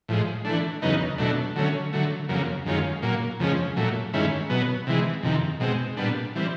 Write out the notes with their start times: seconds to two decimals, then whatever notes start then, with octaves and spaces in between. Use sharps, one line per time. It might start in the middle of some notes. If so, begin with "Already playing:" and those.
0.08 A2 F3 G#3
0.45 E3 A3 D4
0.82 E2 C#3 F#3 B3 D#4
1.18 B2 F#3 A3 D4
1.56 D3 F#3 A3 C#4
1.93 D3 F#3 A3
2.29 F2 C#3 F#3 A#3
2.66 F#2 D#3 G#3 C#4 F4
3.02 A#2 F#3 A#3
3.39 F2 C#3 F3 G#3 C#4
3.76 A#2 F#3 A3
4.13 G2 D#3 G#3 C#4 E4
4.49 B2 F#3 B3
4.87 C3 E3 G#3
5.23 F2 C3 D#3
5.60 B2 G#3 C4
5.97 A#2 G3 B3 D4
6.35 E3 G3 C4